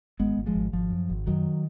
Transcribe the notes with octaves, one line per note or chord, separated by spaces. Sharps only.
G#1 G#3 B3
G#1
F3 G#3
G#1
G#1 F3
F#2
G#1
F#2 D#3 F#3